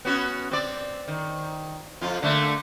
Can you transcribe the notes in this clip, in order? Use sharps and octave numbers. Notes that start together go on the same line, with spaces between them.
B3 C#4 F#4
C4 D5
D#3
F2 F4
D3 A3 A#3